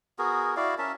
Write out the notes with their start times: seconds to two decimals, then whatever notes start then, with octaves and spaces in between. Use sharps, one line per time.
0.19 B3 F#4 G#4 A#4
0.56 E4 F#4 D5 F5
0.78 C#4 A#4 E5 A5